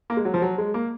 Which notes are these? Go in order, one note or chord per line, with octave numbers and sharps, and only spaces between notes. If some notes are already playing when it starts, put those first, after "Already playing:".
A#3
G#3
F#3
F3
F#3
G#3
A#3